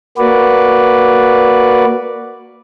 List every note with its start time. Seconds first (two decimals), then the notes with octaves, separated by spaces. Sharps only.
0.18 A#3 F#4 B4 D5